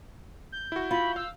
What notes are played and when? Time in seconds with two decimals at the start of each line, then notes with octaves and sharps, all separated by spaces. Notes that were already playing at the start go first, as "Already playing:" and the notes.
0.52 G6
0.72 E4 F#4
0.91 F4 B5
1.16 F5 E6